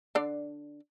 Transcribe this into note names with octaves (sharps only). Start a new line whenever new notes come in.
D3 D4 D5